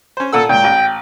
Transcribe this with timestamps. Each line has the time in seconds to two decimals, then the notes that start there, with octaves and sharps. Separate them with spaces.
0.17 C#4 C5
0.33 A#2 A4 F#5 E6
0.49 C#2 A#2 G5
0.64 A1